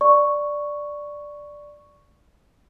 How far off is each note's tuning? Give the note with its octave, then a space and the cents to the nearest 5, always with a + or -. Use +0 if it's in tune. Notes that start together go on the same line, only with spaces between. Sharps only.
D5 +0 C#6 +0